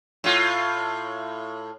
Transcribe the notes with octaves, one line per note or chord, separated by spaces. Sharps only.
A2 F4